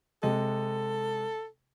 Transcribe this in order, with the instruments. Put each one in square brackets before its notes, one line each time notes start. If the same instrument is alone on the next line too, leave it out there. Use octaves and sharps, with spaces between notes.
[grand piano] C3 G#3 D#5 [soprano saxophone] A4